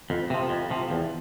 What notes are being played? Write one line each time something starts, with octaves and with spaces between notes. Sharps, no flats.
F2
C3 F3
F2
C3 F3
E2